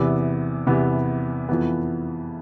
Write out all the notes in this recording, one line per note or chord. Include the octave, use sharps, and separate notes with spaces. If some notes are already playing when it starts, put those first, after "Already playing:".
Already playing: E2 C3 E3 B3
E2 C3 E3 B3
F2 E3 B3